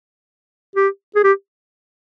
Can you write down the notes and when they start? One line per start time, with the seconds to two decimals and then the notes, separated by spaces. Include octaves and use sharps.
0.76 G4
1.15 G#4
1.24 G4